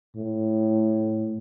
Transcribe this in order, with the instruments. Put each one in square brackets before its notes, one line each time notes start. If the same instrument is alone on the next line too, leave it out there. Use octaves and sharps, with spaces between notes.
[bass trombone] A2